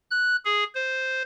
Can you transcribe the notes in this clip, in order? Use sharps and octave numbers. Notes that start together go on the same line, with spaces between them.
F#6
G#4
C5